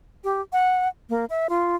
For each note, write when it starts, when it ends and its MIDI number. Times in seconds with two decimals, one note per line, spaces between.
0.24 0.41 67
0.52 0.88 78
1.09 1.25 58
1.30 1.47 76
1.49 1.76 65